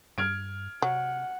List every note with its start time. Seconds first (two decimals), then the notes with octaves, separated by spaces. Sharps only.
0.18 G2 F6 G#6 D7
0.82 C3 F#3 F#5